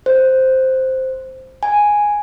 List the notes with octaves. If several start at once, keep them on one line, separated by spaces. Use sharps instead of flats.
C5
G#5